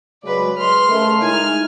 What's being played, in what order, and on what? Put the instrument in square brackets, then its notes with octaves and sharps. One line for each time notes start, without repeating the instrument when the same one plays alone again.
[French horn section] C#3 F#3 G#3 [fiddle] B4 D5
[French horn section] G#3 B4 [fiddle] C6 F6
[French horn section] C#3 A3 A#4
[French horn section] G#3 D#4 E4 [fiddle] G#5 F6